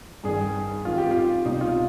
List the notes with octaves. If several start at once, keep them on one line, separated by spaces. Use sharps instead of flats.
G2 D#3 G#4
F2 D#3 F4
G4
F4
C2 B2 D#4
F4